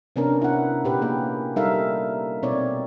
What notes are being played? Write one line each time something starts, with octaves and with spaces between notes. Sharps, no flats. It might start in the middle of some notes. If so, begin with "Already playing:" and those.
C3 B3 C#4 D4 A#4
E4 F#5
A#2 G4 B4
A#3 G#4
G3 D#4 A4 A#4 E5 F5
B2 C4 D#4 C#5 D5